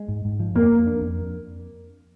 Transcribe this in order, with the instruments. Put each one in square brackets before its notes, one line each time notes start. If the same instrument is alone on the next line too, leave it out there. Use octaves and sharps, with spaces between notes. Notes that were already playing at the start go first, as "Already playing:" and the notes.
Already playing: [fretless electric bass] G#3
G#2
G#2
F3
[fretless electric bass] F2 [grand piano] A#3
[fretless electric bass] F2
D4
F2